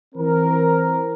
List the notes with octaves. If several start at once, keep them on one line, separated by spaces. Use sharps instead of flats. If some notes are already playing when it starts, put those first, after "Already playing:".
E3 C4 A#4